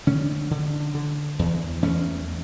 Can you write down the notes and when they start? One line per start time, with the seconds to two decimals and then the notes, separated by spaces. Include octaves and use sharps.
0.07 D3 A3 C#4
0.51 D3
0.95 D3
1.39 E2
1.82 E2 A3 C#4